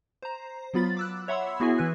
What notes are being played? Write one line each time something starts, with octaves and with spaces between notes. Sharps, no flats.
C5 A#5
F#3 B3 F4 B5 A6
D6 E6 F#6
C#5 E5 F#5 B5 C6 E6
B3 E4 F#4 G#4 E5 G#5
E3 B4 F#6